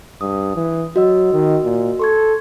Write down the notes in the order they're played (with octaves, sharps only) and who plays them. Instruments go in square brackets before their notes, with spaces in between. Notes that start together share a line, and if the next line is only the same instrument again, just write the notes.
[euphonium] G2 [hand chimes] D#6
[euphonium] E3
[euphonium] F#3 [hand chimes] F#4 D#5 E6
[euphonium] D#3
A#2
[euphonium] A4 [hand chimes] C6 C#6 G#6